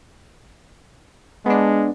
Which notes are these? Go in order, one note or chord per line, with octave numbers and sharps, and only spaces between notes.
G#3 B3 D4